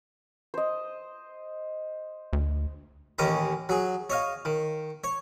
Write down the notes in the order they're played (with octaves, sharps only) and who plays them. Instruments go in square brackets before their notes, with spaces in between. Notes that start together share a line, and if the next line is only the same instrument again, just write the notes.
[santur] C5 D#5
[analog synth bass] D2
[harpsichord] A1 D#2 D#3 C#4 D#5 A#5
F#3 G#4
C#5 D#5 F5
D#3
C#5